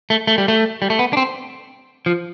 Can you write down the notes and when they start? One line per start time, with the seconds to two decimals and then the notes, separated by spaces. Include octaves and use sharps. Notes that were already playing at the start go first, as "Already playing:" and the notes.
0.10 A3
0.27 A3
0.38 G3
0.48 A3
0.82 G3
0.90 A3
0.99 B3
1.13 D4
1.17 C4
2.06 F3